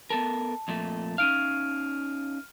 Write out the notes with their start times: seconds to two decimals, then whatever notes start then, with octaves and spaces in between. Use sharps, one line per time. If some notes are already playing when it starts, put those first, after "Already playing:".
0.10 B3 A4 A#4 A5
0.68 F2 A#2 A3
1.18 C#4 D#4 F5 F6 D7 D#7